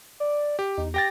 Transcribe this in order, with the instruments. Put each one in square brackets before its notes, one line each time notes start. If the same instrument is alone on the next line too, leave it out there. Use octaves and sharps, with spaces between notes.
[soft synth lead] D5
[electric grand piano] G4
[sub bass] E2 [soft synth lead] D#4
[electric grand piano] G4 G5 A6 [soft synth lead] A#6